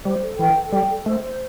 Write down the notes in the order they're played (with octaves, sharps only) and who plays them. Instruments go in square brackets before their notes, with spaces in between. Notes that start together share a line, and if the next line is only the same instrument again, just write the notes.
[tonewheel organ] G3 [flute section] C5
[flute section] A4
[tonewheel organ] E3 [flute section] G5
[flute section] A4
[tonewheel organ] G3 [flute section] G5
[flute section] A4
[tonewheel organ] A3 [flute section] C5
[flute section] C5